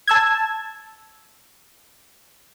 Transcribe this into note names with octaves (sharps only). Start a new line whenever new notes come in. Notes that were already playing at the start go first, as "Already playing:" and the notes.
A5 E6 G#6